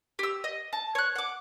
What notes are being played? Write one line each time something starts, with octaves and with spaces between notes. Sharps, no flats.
G4 E6
D#5
A5
C#5 F#6
F#5 D6